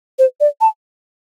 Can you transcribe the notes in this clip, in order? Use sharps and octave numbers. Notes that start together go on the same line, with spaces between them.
C5
D5
A5